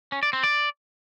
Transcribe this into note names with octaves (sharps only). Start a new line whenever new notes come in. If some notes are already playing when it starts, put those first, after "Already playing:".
C#4
D5
C4
D5